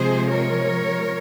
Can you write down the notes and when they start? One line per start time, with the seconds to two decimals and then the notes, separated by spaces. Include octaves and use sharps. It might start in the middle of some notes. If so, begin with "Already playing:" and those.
Already playing: C3 F3 G#3 G#4 C5
0.30 A#4 C#5